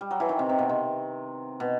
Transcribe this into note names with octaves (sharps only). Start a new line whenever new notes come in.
G3
F#3
E3
D#3
C3
C3
B2
C3
B2